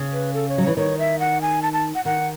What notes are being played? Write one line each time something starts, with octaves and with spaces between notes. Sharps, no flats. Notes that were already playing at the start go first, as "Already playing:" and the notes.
Already playing: C#3
B4
A4
C#5
F#3
E3 C#5
D#3 C#5
E5
F#5
G#5
A5
A5
F#5
D#3 F#5